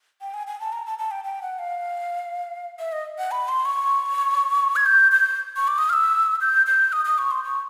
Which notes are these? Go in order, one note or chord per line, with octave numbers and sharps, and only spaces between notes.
G5
G#5
G#5
A5
A#5
A5
A5
G5
G5
F#5
F5
E5
D#5
F#5
B5
C6
C#6
G#6
G6
G6
C#6
D6
D#6
F6
E6
G6
G6
D#6
D#6
C#6
C6
C#6